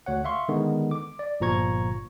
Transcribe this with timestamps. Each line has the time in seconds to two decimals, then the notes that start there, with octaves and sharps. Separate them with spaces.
0.06 D2 C#5 F#5
0.25 E5 F5 C6 C#6
0.49 D3 D#3 G#3 B3
0.91 D6
1.19 D5
1.40 G1 A#2 F3 A#5 C#6 G#6